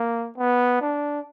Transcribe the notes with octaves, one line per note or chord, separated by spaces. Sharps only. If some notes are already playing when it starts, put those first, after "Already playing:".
Already playing: A#3
B3
D4